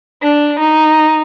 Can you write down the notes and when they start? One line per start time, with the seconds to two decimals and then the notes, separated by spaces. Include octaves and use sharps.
0.23 D4
0.59 D#4